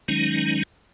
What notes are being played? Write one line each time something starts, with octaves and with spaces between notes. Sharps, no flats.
D#3 F#3 G#3 C#4 D#4